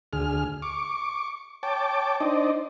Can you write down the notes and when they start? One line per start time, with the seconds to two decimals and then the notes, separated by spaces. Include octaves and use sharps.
0.13 D2 G#4 F6
0.62 C#6 D6
1.63 C#5 G5 A5 D6
2.20 D4 D#4 C5 D5 D#5